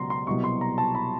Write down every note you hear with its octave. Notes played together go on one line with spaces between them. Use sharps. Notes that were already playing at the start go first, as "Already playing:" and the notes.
Already playing: C#2 B2 F#3 A#5 C6
C6
C2 B2 F#3 C#6
C6
A#5
A5
B5